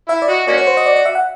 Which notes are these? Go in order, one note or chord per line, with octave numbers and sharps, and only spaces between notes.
E4 E5
D5
F#4 D#5
A#3 C#4 F#4 D5
C#5
C5
D#5
D5
D5
E5
F#5